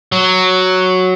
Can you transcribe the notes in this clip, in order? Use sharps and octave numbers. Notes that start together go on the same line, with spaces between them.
F#3